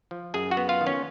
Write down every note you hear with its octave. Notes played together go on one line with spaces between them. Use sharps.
F3
F#2 G#4 G#5
F#4 F#5
B3
F4 F5
D#3
C#4 C#5